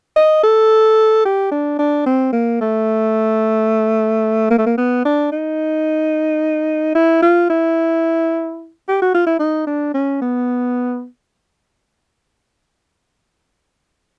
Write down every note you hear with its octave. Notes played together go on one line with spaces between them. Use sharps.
D#5
A4
G4
D4
D4
C4
A#3
A3
A#3
A3
A#3
B3
D4
D#4
E4
F4
E4
G4
F#4
F4
E4
D#4
D4
C#4
B3